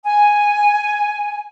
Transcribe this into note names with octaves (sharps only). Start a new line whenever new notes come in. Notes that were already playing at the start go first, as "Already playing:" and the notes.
G#5